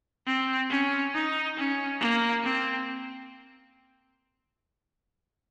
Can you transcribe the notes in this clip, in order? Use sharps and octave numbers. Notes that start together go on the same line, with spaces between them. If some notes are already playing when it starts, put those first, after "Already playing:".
C4
C#4
D#4
C#4
A#3
C4